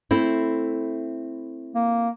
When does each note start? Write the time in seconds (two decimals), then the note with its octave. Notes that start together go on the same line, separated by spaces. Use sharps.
0.11 A3 C4 E4
1.75 A#3